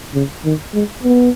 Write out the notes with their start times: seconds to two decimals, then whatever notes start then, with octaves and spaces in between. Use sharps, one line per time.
0.14 C#3
0.45 D#3
0.74 G#3
1.03 B3